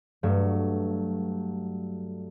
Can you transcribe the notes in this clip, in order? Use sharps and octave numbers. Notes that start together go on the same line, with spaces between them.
G2 F#3 A3